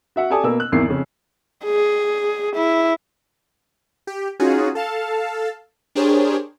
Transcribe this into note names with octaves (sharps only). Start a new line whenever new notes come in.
F#4 E5 F#5
G4 A4 D5 G#5 A5 D#6
B2 A#3 B3 E6
F#6
G#1 E2 A#3 E4 C7
F2 C#3
G#4
E4
G4
C#4 D#4 F4 F#4 G#4
A4 F5 A5
D4 G4 G#4 A#4 C5 C#5